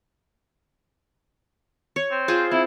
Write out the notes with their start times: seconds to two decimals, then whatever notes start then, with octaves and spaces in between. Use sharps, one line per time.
1.96 C#5
2.11 C4
2.28 F4 G#4 C5
2.51 C4 E4